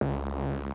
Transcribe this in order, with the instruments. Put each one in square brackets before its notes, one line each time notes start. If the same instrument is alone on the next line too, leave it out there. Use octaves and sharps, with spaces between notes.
[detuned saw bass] C#2